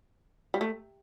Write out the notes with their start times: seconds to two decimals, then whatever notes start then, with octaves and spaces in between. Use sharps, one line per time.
0.54 G3
0.61 A3